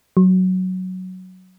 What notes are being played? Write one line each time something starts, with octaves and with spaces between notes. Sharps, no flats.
F#3